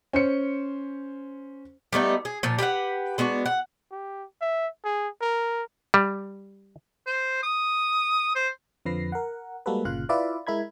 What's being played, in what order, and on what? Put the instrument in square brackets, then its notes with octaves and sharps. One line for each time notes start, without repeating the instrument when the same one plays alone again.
[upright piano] C#4 C5 C#7
[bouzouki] G3 A3 B3 D#4
G#4
A#2 F3
G4 B4 F5 F#5
G#3 B3 D4 F#4
F#5
[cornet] G4
E5
G#4
A#4
[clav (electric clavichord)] G3
[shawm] C5
D#6
C5
[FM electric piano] F2 D3 F3 B4 A#6 C7
A#4 F#5
G3 G#3 A#3 F#4 A4 B4
G1 A#2 C#3 F4 F5 F#6
E4 F4 B4 D5 E5 F5
G#3 E4 A#4 B5 G#6